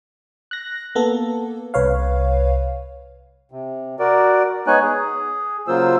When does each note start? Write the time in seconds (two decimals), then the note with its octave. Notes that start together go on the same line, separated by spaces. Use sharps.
0.51 F#6 A#6
0.95 A#3 B3 A4
1.74 C2 B4 C#5 F5
3.51 C3
3.99 F#4 A#4 D5
4.67 G#3 B3 D#4 C#5 G#5 F#6
4.83 G#4
5.68 C#3 F#3 A#3 F4 C5 E6